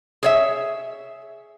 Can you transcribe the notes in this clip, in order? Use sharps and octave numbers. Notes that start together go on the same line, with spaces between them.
G#4 C#5 E5